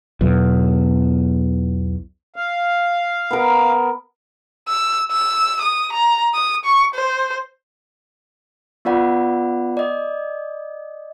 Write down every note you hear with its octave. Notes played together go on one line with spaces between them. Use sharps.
B1 E2
F5
B3 A#4
E6
E6
D#6
A#5
D#6
C#6
C5
B3 F4 D5 F#5 B5
D5 D#5